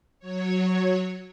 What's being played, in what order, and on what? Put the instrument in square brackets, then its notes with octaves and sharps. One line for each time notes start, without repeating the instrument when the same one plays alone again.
[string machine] F#3 C#5